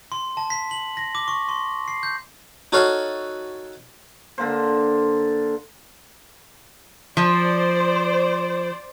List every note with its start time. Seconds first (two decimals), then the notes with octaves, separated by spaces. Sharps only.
0.12 C6
0.37 A5
0.50 B6
0.71 F#7
0.97 A#6
1.15 D6
1.28 C#6
1.49 C6
1.88 C7
2.03 G6
2.72 D#4 F#4 A4 C#5 F5 F#5
4.38 D3 A#3 C5
7.17 F3 C5 D5